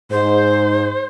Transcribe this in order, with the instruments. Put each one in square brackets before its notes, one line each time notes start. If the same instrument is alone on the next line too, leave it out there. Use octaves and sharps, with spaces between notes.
[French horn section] G#2 [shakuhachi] C5